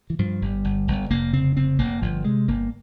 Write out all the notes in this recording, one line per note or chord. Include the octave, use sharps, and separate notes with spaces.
E3
G2 F3
G1 G3
G1
G1
F1 A#3
C#3 C4
F1 C4
F1 A#3
G1 F3
C3 G#3
G1 A#3